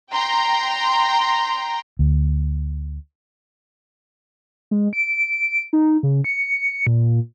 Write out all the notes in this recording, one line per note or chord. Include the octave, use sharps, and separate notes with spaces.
G5 A#5 C6
D2
G#3
D7
D#4
C#3
C#7
A#2